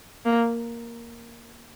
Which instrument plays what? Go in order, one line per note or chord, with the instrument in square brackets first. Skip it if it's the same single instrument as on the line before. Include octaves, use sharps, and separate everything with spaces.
[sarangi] A#3